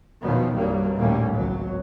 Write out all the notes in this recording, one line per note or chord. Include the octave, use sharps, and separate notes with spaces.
E2 B2 D#3 F3 F#3 B3
C2 G2 F#3 G3 A#3
A#1 D#2 A2 G3 A#3 C#4
G#1 C#2 F#3